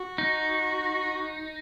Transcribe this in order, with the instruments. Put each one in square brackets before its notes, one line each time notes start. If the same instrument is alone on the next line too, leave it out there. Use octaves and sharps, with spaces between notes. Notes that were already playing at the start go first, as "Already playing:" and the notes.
Already playing: [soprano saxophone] F#4
[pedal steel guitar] D#4